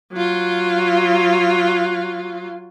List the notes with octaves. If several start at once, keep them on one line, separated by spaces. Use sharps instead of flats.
F#3 F4